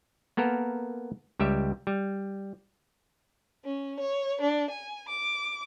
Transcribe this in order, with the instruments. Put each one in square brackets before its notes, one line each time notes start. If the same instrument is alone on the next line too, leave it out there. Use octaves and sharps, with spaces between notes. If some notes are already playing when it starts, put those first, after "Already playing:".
[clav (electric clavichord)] A#3 B3 A4 A#4
C#2 G3 G4 E5
G3
[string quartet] C#4
C#5
D4
G#5
D6